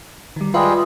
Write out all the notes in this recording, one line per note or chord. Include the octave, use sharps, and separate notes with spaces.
D#3 G3
G3 G#3 F4 B4 E5